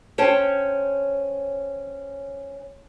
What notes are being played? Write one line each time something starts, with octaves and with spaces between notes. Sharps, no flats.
C#4 C5 C#5 G5 A5